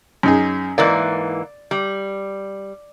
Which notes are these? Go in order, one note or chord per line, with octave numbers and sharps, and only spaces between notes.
F#2 D#4 G#4
G#2 E3 A#3 D5
G3